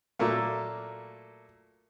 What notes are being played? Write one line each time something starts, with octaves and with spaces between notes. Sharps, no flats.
A#2 F#3 A3 A#3